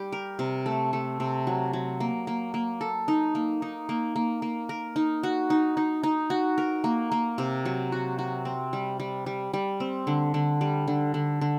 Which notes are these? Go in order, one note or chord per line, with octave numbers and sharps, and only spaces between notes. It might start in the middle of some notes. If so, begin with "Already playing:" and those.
Already playing: G3 G4
A#4
C3
A3
A3
C3
F#3
F#3
A#3
A#3
A#3
A4
D#4
A#3
D#4
A#3
A#3
A#3
A#4
D#4
F#4
D#4
D#4
D#4
F#4
A#4
A#3
A#3
C3
F#3
F#4
F#4
C4
G3
G3
G3
G3
C4
D3
D3
G3
D3
D3
D3